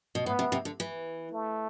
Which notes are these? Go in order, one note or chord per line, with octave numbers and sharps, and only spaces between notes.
B2
A2 B3
C3
C3
D3
E3
A3